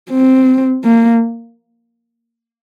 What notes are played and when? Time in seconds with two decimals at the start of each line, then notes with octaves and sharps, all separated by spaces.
0.10 C4
0.84 A#3